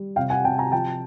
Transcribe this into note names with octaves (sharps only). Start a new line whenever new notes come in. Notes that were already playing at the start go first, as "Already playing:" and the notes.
Already playing: G3
C3 F5 G5
F#5 G#5
C3 G5 A5
G#5 A#5
F3 G5 A5